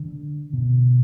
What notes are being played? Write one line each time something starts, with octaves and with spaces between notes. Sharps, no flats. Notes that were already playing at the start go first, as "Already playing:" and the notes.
Already playing: D3
B2